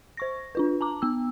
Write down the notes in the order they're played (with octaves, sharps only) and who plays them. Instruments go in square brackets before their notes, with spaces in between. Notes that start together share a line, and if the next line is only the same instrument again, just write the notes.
[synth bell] C5 C#6 A#6
D4 F4 B4
A5 A#5 D6
B3 E6